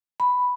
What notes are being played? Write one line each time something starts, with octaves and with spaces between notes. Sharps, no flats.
B5